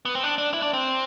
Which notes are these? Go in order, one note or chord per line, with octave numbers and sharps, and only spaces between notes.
B3
C4
D4
D4
E4
D4
C4